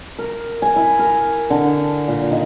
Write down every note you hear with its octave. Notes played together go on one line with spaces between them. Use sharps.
A#4
G#5
E4
A#4
D3
A#2
D#3